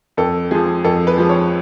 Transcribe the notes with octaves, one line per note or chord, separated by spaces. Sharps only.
F2 A4
F3 G#3 G#4
F2 A4
B4
F3 G#3
C#5